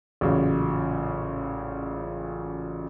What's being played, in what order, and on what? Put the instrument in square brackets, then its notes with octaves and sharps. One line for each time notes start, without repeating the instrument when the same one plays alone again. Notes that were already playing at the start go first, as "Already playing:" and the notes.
[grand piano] A1 A#2 C#3 F#3